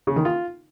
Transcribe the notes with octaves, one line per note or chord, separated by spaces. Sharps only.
C#3
D#3
F4